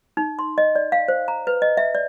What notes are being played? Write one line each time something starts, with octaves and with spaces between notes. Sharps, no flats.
D#4
C6
D#5
D5
F5
C5
A#5
B4
D#5
E5
D5